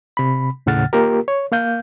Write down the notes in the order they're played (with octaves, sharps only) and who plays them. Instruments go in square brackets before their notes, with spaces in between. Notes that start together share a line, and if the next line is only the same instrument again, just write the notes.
[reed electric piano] C3 B5
D#2 A2 C#3 F#5 F6 A6
A#3 F4 G4 A#4
C#5
A#3 F5 G6